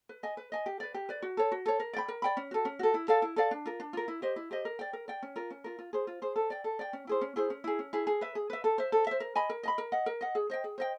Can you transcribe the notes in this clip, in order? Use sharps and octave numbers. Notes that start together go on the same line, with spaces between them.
B4
D#5 G#5
B4
D#5 G#5
G4
B4 D5
G4
B4 D5
F#4
A4 C#5
F#4
A4 C#5
A#4
D5 G5 B5
A#4
D5 G5 B5
C#4
F#4 A4
C#4
F#4 A4
E4
A4 D5 F5
E4
A4 D5 F5
D4
F4 A#4
D4
F4 A#4
E4
G4 C5 D#5
E4
G4 C5 D#5
A#4
D5 G5
A#4
D5 G5
C#4
F4 A#4
C#4
F4 A#4
F4
G#4 C5
F4
G#4 C5
A4
D5 G5
A4
D5 G5
C#4
E4 G#4 C5
C#4
E4 G#4 C5
C#4
E4 G#4
C#4
E4 G#4
G#4
B4 E5
G#4
B4 E5
A4
C5 E5
A4
C5 E5
A#4
D#5 G#5 B5
A#4
D#5 G#5 B5
A#4
D#5 F#5
A#4
D#5 F#5
G#4
C5 D#5 G5
G#4
C5 D#5 G5